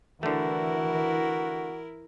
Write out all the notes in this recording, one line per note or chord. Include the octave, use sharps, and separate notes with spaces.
D3 E3 A3 E4 F#4 A#4